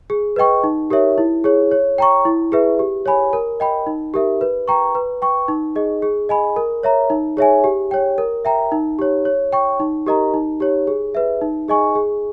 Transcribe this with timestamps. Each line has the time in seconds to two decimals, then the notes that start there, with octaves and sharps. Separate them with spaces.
0.10 G#4
0.36 B4 D#5 G5 C#6
0.64 D#4
0.90 G4 A#4 C#5 E5
1.18 E4
1.44 G#4 C#5
1.71 C#5
1.98 G5 A#5 C#6
2.25 E4
2.52 G#4 B4 E5
2.79 G4
3.06 C#5 G#5 B5
3.33 A#4
3.60 D#5 G5 B5
3.87 D#4
4.14 G4 A#4 E5
4.41 B4
4.68 G5 A#5 C#6
4.95 B4
5.22 G5 C#6
5.48 D#4
5.76 G#4 D#5
6.02 G#4
6.29 D#5 G#5 B5
6.56 A#4
6.83 C#5 E5 A#5
7.10 D#4
7.37 G#4 C#5 E5 G#5
7.64 G4
7.91 C#5 G5
8.18 A#4
8.45 E5 G5 A#5
8.72 D#4
8.99 G4 C#5
9.25 C#5
9.53 G5 C#6
9.80 D#4
10.06 G4 A#4 D#5 A#5
10.34 D#4
10.60 G4 C#5
10.87 G#4
11.15 B4 E5
11.41 D#4
11.68 G#4 D#5 G#5 C#6
11.95 G#4